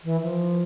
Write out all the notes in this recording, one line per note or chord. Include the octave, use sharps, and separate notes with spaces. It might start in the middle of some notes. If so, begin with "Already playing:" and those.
E3
F3